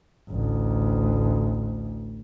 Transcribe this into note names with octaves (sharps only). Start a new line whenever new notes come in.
A1 D2